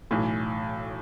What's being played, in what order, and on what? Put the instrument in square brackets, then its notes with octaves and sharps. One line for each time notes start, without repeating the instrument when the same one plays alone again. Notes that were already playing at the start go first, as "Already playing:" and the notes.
[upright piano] B1 A2 E3